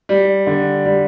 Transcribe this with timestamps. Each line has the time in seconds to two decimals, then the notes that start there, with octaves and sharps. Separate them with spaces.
0.09 G3
0.47 D3
0.85 G3